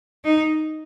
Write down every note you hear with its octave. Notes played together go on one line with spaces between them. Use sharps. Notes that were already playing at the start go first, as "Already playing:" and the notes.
D#4